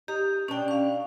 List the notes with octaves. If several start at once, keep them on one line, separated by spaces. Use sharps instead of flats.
D#4 G4
B2 C#4 D4 G5
F5 C#6